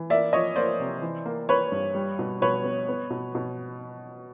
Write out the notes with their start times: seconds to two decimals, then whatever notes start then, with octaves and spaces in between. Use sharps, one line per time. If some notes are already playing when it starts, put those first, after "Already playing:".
Already playing: E3
0.10 A#3 D5 E5
0.33 F3 C#5 D#5
0.56 A#3 C5 D5
0.80 C3
1.02 E3
1.26 A#3
1.49 A#3 B4 C#5
1.72 G2
1.95 G3
2.19 B2
2.42 B2 B4 C#5
2.64 B3
2.88 B3
3.10 B2
3.35 B2